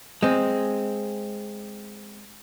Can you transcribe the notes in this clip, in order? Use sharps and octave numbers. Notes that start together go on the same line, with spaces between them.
G#3 C4